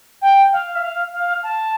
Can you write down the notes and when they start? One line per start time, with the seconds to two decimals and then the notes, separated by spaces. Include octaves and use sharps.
0.22 G5
0.52 F5
0.75 E5
0.83 F5
1.12 F5
1.43 A5